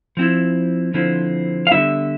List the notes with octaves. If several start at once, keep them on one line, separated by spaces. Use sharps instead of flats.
F3 C4 E4
D3 F3 C4 E4
F5
D3 G3 B3 E4 E5